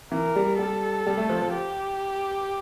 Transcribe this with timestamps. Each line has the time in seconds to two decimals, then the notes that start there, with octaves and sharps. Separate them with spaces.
0.11 E3 A#4
0.36 G3
0.58 G3 A4
1.06 G3
1.18 A3
1.30 F3
1.42 F3
1.53 G4